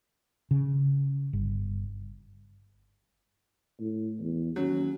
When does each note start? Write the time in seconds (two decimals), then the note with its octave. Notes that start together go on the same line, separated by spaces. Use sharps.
0.51 C#3
1.33 G1
3.80 A2
4.20 E2
4.56 D#2 F#3 C#4